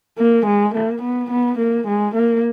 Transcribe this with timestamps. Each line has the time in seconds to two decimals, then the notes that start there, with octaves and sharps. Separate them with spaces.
0.18 A#3
0.46 G#3
0.74 A#3
1.02 B3
1.31 B3
1.59 A#3
1.87 G#3
2.15 A#3